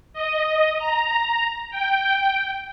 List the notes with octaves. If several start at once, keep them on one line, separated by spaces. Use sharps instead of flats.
D#5
A#5
G5